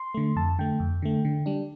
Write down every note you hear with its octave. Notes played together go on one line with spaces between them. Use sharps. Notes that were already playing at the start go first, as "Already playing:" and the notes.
Already playing: C6
D3 A3
F2 A5
D3 A3 G5
F2
D3 A3
D3
G3 D4